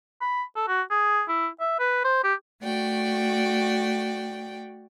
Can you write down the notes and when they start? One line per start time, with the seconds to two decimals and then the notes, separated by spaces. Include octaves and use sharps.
0.21 B5
0.56 A4
0.68 F#4
0.90 G#4
1.28 E4
1.60 E5
1.79 B4
2.04 C5
2.24 G4
2.62 A3 F#4 D5 G5